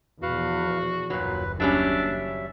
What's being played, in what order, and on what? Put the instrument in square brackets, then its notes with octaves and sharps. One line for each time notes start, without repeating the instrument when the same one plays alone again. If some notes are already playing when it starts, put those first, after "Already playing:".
[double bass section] E2 B2 F3 [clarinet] F#4 [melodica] B4 F5
[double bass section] F#1 D#2 [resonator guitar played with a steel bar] A#2 F#3 [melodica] B4
[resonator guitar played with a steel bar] F#3 G3 C#4 [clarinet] D4 [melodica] E5